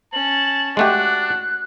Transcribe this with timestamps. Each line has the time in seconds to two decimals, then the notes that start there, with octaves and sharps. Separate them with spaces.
0.13 C#4 A5 F#7
0.77 G#3 A3 D4 F#4 G4 F#6